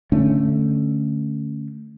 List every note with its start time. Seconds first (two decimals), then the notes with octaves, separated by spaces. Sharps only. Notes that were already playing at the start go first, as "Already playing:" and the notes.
0.12 D3 A3 C#4 D4